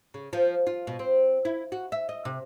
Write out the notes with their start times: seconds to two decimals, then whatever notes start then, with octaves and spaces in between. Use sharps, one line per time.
0.14 C#3
0.33 F3
0.67 F4
0.87 B2
0.99 C4
1.45 E4
1.72 F#4
1.92 E5
2.09 D#5
2.25 C3